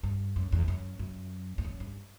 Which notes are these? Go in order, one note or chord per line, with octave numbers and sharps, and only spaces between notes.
G2
F#2
E2
F#2
F#2
E2
F#2
G2